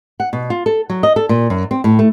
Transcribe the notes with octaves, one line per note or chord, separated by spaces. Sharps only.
F#5
B2
F4
A4
F#3
D#5
A4
A#2
F#2
C4
A2
A3